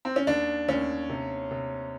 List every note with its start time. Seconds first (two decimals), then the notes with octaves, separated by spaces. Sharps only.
0.05 C4
0.16 C#4
0.27 D#2 D4
0.68 D#2 C#4
1.09 C3
1.51 C3